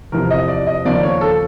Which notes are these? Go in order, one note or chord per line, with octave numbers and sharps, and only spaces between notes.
E2 C3 F3 A#4
D#5
D5
D#5
D#2 C#3 F3 A#3 D5
C#5
A4